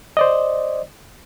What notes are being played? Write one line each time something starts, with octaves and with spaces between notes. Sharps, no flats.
C5 D5 D#5